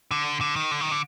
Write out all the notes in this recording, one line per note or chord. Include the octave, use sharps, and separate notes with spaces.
D3
D3
D#3
D3
D#3
D3